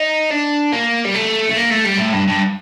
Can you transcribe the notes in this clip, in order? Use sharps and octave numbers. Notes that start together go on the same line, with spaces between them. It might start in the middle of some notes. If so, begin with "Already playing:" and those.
Already playing: D#4
D4
A#3
G3
A3
A3
A#3
A3
G3
A2
G2
G2